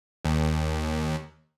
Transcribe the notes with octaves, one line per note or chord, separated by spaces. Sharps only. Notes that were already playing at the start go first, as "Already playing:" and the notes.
D#2